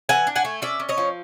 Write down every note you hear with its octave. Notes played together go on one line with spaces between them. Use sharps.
E3 F#5 G#5
D4
F#5 G#5
A3
C#4 D5 E5
C#4
C#5 D#5
F3